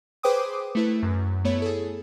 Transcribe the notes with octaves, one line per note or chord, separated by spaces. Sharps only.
G#4 B4 C5 G5 D6 D#6
A3 E4 B4
F#2
A3 B3 E4 C#5
G#4 A4